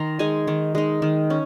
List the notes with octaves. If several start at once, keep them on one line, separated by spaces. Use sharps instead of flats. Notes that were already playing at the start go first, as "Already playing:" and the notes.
Already playing: D#3 A#5 C6
G#3 D#4 G#5
D#3
G#3 D#4
D#3
C#4